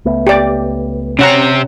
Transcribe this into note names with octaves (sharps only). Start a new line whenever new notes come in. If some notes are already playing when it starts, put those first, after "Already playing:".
C#2 A3 B3
G4 D5
C3 C4 C#4 F#5 A#5